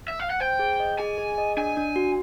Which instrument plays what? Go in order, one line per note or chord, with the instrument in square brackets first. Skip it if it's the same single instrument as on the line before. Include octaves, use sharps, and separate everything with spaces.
[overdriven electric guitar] E5
F5
F#5
[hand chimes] C5 [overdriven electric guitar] G5
[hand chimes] G#4
D#5
[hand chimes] G#4 [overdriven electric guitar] G#5
[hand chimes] G#4
D#5
[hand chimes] D4 [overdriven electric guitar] G#5
[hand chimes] D4
F#4